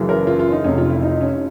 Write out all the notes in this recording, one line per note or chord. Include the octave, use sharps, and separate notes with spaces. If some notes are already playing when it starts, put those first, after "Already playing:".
Already playing: F#1 F#2 C#3 E3
A#4
F4
F4
D#4
F1 F2 C3 C#4
F4
E4
D#4
C#4